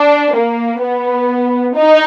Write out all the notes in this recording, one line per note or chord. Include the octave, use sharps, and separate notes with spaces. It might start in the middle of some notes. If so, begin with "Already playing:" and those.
Already playing: D4
A#3
B3
D#4